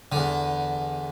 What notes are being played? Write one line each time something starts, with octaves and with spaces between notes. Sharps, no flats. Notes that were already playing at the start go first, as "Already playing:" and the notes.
E2 D3